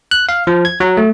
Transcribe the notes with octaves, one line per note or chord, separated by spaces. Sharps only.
F#6
F5
F3
G#6
F#3
A3